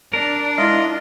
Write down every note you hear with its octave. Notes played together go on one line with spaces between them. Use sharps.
D4 A#4
G#3 E4 F4 D#5